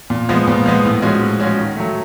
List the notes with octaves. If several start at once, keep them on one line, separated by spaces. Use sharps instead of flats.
A#2
F3 G#3 B3
A#2
F3 G#3 B3
A2
F3 G#3 C#4 F#4
A2
F3 G#3 C#4 F#4
D#3
F#3 A3